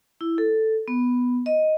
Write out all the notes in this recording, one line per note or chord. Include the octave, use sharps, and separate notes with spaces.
E4
A4
B3
D#5